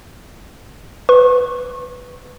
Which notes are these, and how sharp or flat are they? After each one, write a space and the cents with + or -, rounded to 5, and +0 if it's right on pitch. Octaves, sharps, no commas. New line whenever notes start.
B4 +5 C#6 -35